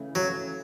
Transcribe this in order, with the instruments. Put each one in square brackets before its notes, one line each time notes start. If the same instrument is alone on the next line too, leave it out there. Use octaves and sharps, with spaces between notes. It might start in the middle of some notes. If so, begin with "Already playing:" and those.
Already playing: [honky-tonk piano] C#3 E3 A3
[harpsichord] F#3